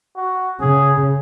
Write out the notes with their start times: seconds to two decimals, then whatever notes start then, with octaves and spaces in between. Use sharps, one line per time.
0.16 F#4
0.61 C#3 G#4